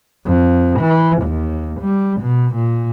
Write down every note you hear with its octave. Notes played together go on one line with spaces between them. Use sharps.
F2
E3
D#2
G3
B2
A#2